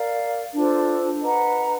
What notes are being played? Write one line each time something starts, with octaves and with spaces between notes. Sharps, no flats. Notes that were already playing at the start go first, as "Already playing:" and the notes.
Already playing: A#4 D5 F5
D4 F4 A4 C5
B4 D#5 F#5 A#5